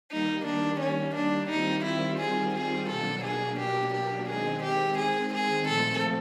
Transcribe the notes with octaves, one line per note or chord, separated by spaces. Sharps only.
D#3 G3 A#3 D#4
D4
C#4
D4
D#3 G3 C4 D#4 F4
E4
G#4
G#4
B2 F#3 A#3 D4 A4
G#4
G4
G4
D#3 G#3 C4 G#4
G4
G#4
G#4
A#2 F3 A3 C4 A4